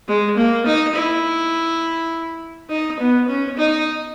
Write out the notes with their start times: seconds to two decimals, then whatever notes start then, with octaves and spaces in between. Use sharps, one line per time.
0.08 G#3
0.37 A#3
0.66 D#4
0.95 E4
2.70 D#4
3.00 B3
3.28 C#4
3.57 D#4